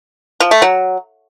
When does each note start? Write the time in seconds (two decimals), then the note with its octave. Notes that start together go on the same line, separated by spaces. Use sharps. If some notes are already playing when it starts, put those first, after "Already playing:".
0.40 F3
0.51 A3
0.62 F#3